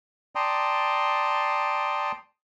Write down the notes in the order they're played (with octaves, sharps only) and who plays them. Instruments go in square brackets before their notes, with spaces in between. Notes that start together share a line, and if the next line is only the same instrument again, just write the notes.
[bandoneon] D5 G5 A5 A#5 C6 D#6